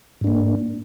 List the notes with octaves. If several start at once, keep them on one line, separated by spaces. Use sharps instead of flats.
G#2 A#3 D4